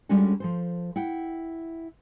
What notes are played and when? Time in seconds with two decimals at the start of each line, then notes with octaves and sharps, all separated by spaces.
0.09 G3 G#3 C#4 D4 F#4 A4
0.40 F3 A4 C5
0.96 E4 F#5 G5